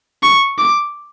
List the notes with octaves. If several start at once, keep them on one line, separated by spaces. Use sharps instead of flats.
C#6
D6